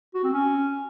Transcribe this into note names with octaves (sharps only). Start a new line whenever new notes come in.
F#4
C4
C#4